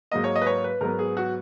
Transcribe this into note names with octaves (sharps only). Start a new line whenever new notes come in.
G#2 F#3 A#3 D#5
C#5
D#5
B4
C#5
B4
G#2 F#3 B3 A#4
G#4
F#4